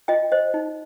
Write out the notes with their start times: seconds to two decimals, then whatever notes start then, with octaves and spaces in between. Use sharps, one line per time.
0.08 F4 D#5 G5
0.32 C5 D#5
0.54 D#4